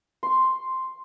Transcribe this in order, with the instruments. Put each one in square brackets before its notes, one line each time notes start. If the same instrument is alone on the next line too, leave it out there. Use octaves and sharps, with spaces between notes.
[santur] C6 C#6